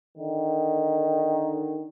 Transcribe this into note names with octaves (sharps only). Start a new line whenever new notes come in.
D3 D#3